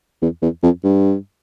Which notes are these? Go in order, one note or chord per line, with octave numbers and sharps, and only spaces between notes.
E2
E2
F2
G2